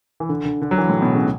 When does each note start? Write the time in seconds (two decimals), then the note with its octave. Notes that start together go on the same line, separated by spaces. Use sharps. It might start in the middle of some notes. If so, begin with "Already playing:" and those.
0.20 E3
0.29 D3
0.45 D3
0.62 D3
0.71 F#3
0.78 E3
0.89 A2
1.02 B2
1.13 C#3